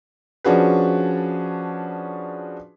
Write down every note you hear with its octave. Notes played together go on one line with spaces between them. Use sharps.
F3 C#4 D4 F#4 G#4 B4